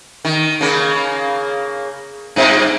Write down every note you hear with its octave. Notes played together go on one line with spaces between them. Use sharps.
D#3
C#3 A#3
G2 A#2 C4